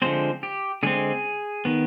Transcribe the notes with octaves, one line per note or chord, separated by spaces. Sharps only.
D3 F3 G#3 C4 C5
G4
D3 G#3 C4 G#4
D#3 B3